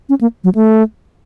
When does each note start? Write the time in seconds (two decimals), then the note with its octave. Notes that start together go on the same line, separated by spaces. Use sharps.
0.09 C#4
0.21 A#3
0.44 F#3
0.55 A3